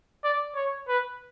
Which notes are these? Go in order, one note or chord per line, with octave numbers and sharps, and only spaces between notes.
D5
C#5
B4